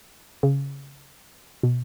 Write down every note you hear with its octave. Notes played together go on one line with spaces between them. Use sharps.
C#3
B2